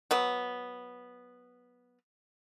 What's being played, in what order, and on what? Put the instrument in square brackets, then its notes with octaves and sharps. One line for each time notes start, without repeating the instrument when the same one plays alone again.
[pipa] F#3 B3